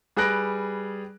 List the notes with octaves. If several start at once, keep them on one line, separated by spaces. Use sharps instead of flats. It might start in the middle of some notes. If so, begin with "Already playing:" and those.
G3 G#4 B4 F#6 A#6 D7